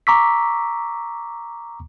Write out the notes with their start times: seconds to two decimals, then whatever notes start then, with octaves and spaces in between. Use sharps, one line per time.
0.07 A#5 C#6 D6 E6 B6